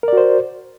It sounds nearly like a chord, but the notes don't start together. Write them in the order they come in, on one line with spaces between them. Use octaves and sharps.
A#4 D5 F#4 C5